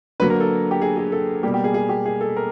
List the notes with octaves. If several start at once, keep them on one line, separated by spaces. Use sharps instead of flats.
D3 F#3 A#3 B4
A#4
A4
G4
G#4
G#4
A4
B2 G3 A#3 G4
G4
G#4
G#4
G4
G#4
A4
A#4